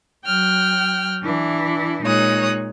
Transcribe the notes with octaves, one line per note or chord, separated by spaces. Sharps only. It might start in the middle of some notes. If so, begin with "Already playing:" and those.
F#3 G5 F6 F#6
E3 D4 E4
A#2 G#3 D#4 C#5 D#6 F#6